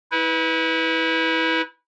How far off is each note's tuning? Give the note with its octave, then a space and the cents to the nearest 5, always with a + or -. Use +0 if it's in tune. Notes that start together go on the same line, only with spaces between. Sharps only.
E4 -30 B4 +0